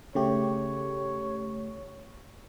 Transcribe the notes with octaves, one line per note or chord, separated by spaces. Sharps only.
C#3 A3 G4 C#5